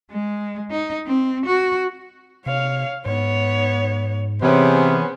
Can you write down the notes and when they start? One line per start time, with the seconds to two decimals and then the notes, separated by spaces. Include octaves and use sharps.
0.11 G#3
0.71 D#4
1.06 C4
1.46 F#4
2.46 C3 C#5 F5
3.06 G#2 B3 C#5
4.42 C3 E3 B3 C#4 G#4 C5